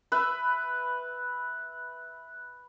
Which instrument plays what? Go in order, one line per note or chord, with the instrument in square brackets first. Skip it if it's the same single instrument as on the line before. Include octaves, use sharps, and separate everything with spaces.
[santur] B4 E5